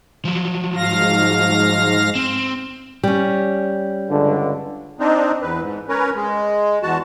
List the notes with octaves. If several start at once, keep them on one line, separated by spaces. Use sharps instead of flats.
F3 F#3
G#2 F5 A#6
C4
G3 C#4
C#2 G2 D3
C4 D4 D#4
E2 B4
G#2
C#4 A#4 B4 C#5
G#3
E2 F#4 A5